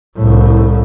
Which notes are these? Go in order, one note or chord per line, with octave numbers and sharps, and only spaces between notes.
C2 A2